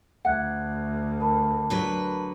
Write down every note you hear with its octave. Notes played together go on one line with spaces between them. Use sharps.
D2 E5 F#5 F#6 G#6
A#4 A5 B5
D3 F#3 B4